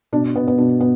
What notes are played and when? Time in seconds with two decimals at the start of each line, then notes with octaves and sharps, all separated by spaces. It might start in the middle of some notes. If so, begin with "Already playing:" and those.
0.12 B2 D4
0.36 B2 B3
0.48 B3
0.58 B2 D4
0.80 B3